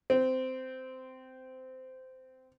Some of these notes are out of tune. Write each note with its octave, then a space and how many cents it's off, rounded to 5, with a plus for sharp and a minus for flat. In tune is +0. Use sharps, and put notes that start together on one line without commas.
C4 -15